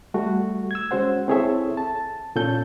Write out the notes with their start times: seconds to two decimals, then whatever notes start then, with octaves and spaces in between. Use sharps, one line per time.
0.14 G3 A3 F#4
0.71 E6 G#6
0.91 G#3 C#4 F#4 C5 F#5
1.28 C4 E4 G#4 A4 C#5 E5
1.77 A5
2.36 A#2 C#4 F4 A4 G6